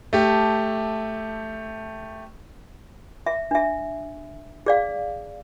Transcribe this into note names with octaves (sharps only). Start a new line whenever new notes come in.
A3 G4
E5
D4 E5
G#4 D5 F5